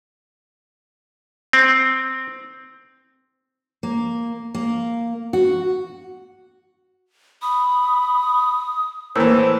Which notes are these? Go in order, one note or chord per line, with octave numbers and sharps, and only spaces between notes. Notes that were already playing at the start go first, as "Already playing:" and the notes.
C4
A#3
A#3
F#4
B5 D#6
A2 E3 A#3 A#4 C5 E6